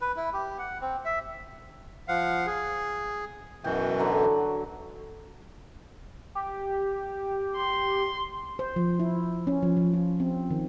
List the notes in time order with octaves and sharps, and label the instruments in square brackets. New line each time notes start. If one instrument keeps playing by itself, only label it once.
[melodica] B4
E4
G4
F#5
C4
E5
[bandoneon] F3 F5 F#5
G#4
[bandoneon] F#2 B2 E3 [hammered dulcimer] F#4 G5
[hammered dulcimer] D3 F#3
[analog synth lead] G4
[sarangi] C6
[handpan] C5
F3
E4
C#4
F3
F3
F4
C4
D#3